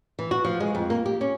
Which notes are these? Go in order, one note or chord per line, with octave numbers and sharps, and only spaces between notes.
E3
F#4
F3
G#3
F2
A#3
G4
C#4